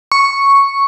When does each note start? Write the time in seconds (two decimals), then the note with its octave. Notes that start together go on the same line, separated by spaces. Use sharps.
0.12 C#6